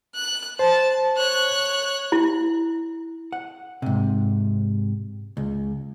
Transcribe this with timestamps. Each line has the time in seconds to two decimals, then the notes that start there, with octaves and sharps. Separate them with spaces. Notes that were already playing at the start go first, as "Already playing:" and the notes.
0.15 F#6
0.59 C5 A5
1.16 C#5 F#6
2.12 E4
3.33 F#5
3.82 G#2 C3
5.37 C#2